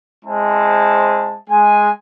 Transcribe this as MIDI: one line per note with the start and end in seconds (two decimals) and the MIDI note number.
0.24 1.37 56
0.24 1.37 60
0.24 1.37 64
0.24 1.37 68
0.24 1.37 72
0.24 1.37 81
1.50 1.91 56
1.50 1.91 80